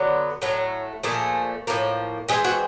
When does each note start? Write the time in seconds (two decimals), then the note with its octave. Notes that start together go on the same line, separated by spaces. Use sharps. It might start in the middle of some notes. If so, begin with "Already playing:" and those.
Already playing: D3 F#3 B3
0.42 A2 F#3 A3
1.03 A#2 F3 A3 G#4
1.67 A2 F3 A#3
2.28 E3 G#3 C4 G#4
2.44 F#4